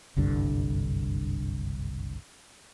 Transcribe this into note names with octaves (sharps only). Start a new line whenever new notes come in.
F#1 C2 G2 D3